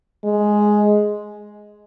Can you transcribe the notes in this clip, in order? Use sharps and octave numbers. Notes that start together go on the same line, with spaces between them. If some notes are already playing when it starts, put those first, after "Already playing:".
G#3